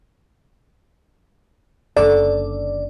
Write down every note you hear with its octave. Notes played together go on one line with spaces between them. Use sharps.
F#1 D3 A4 D5